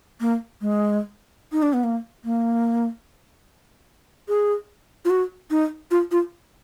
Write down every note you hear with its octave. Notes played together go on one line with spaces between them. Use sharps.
A#3
G#3
D#4
D4
B3
A#3
A#3
G#4
F4
F#4
D#4
F4
F4